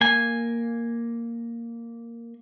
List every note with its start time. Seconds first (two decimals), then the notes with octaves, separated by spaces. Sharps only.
0.01 A#3 G#5